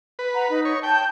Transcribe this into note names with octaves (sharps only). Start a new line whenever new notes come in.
B4
F#5 A#5
D#4
C#5
G5 A5 G6